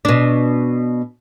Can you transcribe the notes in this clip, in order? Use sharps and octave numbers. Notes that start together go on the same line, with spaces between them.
B2 D4